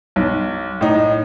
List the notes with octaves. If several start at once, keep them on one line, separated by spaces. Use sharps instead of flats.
B1
A2 D#4